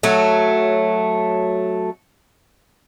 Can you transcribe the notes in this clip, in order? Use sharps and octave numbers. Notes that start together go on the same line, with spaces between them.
F#3 A3